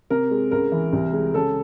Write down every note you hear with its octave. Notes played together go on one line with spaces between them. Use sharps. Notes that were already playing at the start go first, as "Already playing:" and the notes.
C3 A#4
G#3
C#2 A#4
E3
C2
G#3
C#3 A4